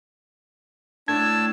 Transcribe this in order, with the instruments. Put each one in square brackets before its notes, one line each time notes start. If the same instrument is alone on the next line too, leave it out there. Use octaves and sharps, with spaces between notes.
[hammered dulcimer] A2 [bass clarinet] D4 [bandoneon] A5 E6 [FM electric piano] G#6